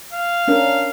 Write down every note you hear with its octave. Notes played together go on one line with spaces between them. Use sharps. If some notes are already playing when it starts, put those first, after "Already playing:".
F5
C#4 D4 A#4